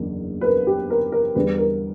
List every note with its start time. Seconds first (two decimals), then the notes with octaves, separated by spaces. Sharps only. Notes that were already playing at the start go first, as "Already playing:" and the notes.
Already playing: F#1 E2 D3 A#3
0.41 B4
0.44 A#4
0.67 G4
0.90 A#4
1.12 A#4
1.35 E2 D3 G3 B4
1.58 A#4